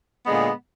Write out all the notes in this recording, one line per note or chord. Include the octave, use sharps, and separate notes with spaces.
A#2 D3 G#3 B3